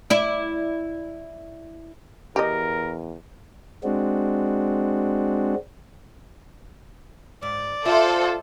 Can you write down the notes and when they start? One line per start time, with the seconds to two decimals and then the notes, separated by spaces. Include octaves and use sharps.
0.10 E4 D5
2.36 E2 G4 A#4 D#5
3.84 G#3 C4 D4 F#4
7.42 G#2 D5
7.85 F4 A4 C5 E5